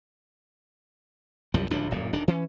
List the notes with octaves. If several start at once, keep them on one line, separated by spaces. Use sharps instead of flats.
C2 F#2 F3 G3
D1 C#2 F3 D4
D1 F#2 A#2
D#1 D#3 D4
E3 C#4